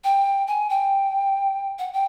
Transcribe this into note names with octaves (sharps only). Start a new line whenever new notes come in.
G5
G#5
G5
F#5
G5